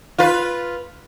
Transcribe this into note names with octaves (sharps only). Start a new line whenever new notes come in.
F4 B4